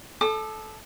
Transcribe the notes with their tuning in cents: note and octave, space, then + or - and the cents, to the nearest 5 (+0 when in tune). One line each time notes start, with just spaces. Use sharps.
A4 -15 D6 +45